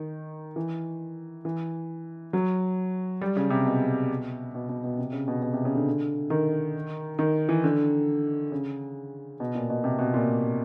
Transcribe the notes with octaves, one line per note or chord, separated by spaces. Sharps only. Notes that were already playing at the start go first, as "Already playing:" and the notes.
Already playing: D#3
E3
E3
F#3
G3
C#3
C3
B2
B2
B2
B2
C3
C#3
B2
B2
C3
C#3
D3
D#3
D#3
E3
D3
C#3
B2
A#2
B2
C3
B2
A#2